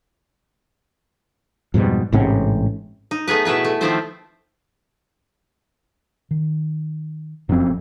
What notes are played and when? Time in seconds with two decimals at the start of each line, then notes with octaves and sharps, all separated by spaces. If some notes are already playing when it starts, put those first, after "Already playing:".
1.74 F2 G#2 B2 G3
2.12 A1 G#2 C3 C#4
3.11 D#4
3.28 A3 B3 G#4 B4
3.45 B2 E4 B4 C#5
3.64 A3
3.81 D#3 F3 C4 E4 A4 C5
6.31 D#3
7.49 F1 F#2 F3 B3 C4